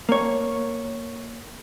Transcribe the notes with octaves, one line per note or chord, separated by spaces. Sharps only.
A#3 C#5